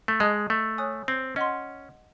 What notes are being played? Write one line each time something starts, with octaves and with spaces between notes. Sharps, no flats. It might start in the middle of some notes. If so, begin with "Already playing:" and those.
A3
G#3 D#5 A5 D#6 F#6
A3
C#5 G#5 D#6 F#6
C4
C#4 D#5 F#5 C6